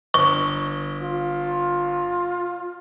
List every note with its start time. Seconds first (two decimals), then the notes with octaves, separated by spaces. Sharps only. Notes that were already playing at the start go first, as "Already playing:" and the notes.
0.14 G1 C#6
1.02 F4